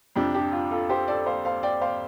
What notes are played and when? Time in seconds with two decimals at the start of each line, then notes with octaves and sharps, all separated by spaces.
0.16 F2 C3 D4 G4
0.34 D4 G4
0.52 F4
0.71 F4 A4
0.89 G4 C5
1.08 A4 D5
1.26 C5 F5
1.45 C5 F5
1.63 D5 G5
1.81 C5 F5